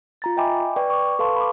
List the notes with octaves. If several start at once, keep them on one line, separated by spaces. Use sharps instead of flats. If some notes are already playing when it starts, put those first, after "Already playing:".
F4 A#5 A6
D#5 E5 G5 G#5 B5 D6
B4 D5 G5 C#6
C#6 D6
A4 B4 F5 A5 C6 C#6
B5 D6